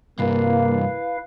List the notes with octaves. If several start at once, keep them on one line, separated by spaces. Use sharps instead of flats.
C2 G2 A#3 E4 B4 F5